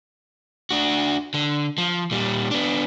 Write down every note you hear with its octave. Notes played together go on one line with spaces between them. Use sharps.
D4 F#4
D3
F3
A#2 G3
B3 D4